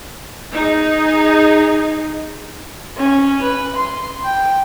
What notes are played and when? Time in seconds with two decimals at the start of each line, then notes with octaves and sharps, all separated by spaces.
0.53 D#4 G#4
2.97 C#4
3.42 B4
3.76 C6
4.25 G5